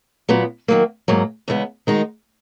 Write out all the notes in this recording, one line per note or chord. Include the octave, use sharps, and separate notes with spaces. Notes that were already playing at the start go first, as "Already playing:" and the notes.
A#2 F#3 B3
D#3 F#3 A#3
G#2 F#3 A#3
E2 C#3 G#3 B3
D#3 G#3 D#4 F#4